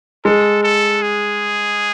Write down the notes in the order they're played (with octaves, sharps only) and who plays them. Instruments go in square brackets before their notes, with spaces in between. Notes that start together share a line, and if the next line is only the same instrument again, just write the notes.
[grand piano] G#3 [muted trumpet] A4
[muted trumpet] A4
G#4